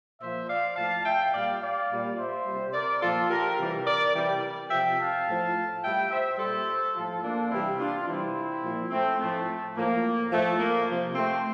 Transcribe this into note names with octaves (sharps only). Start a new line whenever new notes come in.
A#2 F3 C5 E5
D5 F5
A2 F3 F5 A5
E5 G5
A#2 G3 D5 F5
D5 F5
A#2 G3
C5 E5
C3 G3
A#4 D5
A#2 F3 F4 A4
G4 A#4
C3 E3 G3
A#4 D5
C3 E3 G3
C3 F3 E5 G5
F5 A5
A2 F3
A2 G3 E5 G5
C5 E5
A#2 G3 A4 C5
A2 F3 F4 A4
A#3 D4
C3 E3 G3 C4 E4
D4 F4
C3 E3 G3 C4 E4
A#2 F3
A3 C4
A2 F3 A3
A2 F3 A#3
A2 F3 A3
A#3
C3 F3 A#3
A3 C4